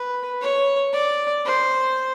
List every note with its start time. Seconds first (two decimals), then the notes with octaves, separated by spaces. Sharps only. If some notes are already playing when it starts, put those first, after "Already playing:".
Already playing: B4
0.41 C#5
0.93 D5
1.45 C5